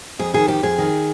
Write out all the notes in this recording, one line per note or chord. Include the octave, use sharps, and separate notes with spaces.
F2 G#4
D#3 G#4
F2 G4
F2 G#4
D#3